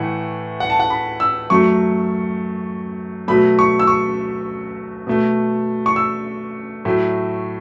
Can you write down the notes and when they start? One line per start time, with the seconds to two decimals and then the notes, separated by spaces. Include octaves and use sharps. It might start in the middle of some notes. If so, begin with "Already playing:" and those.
Already playing: A2 E3 A3 F#5
0.60 F#5
0.70 A5
0.80 F#5
0.90 B5
1.20 E6
1.50 F#2 F#3 A3 C#6
3.28 B2 F#3 A3 B5
3.59 C#6
3.79 E6
3.87 C#6
5.07 B2 A3
5.86 C#6
5.96 E6
6.85 A2 F#3 A3